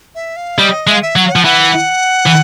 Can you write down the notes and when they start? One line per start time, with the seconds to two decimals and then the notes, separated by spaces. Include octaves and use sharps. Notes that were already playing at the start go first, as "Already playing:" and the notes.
0.15 E5
0.36 F5
0.58 G3 D#5
0.87 G#3 E5
0.94 F5
1.02 E5
1.16 F#3 F#5
1.25 F5
1.32 F3 F#5
1.45 E3 F#5
2.26 E3